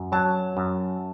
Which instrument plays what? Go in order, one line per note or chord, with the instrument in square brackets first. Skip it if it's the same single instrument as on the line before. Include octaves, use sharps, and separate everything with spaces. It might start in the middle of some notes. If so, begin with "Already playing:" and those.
Already playing: [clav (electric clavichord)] F#2
[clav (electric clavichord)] F#3 [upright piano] A5
[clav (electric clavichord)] F#2